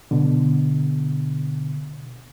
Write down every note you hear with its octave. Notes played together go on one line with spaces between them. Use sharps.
B2 D3